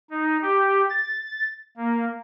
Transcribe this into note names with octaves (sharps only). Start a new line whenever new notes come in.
D#4
G4
A6
A#3